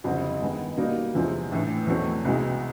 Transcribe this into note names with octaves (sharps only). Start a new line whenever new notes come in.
F#1 F2 D3 G3 C4
G2 D#3 G#3 B3
B2 G3 A#3 D#4
E2 C3 F3 G#3 C4
A#1 A2 E3
E2 B2 F#3 A3 C4
C2 B2 G#3